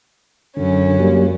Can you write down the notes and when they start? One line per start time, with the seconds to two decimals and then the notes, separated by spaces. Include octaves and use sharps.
0.57 F#2 D3 C#4
1.00 F#3 G3 A#3